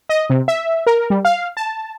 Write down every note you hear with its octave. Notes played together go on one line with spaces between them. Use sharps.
D#5
C3
E5
A#4
G3
F5
A5